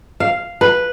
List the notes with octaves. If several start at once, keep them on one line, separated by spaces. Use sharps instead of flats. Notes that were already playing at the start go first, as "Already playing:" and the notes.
F5
B4